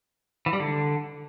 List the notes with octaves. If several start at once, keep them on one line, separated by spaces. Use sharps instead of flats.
E3
G3
D3